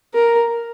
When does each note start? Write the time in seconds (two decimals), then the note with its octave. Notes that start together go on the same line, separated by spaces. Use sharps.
0.14 A#4